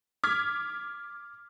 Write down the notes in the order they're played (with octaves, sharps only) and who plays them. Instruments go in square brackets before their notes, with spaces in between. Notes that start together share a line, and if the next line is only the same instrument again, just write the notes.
[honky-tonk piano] D6 F6 G#6 B6